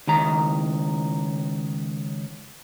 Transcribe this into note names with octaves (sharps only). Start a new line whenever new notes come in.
C#2 D#3 A#5